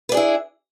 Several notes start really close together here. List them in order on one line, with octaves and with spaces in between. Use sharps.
B4 D4 G#4 E4